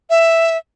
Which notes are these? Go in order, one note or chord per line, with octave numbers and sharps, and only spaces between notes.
E5